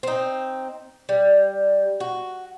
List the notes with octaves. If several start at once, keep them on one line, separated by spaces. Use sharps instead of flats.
C4 D#4
G3
F#4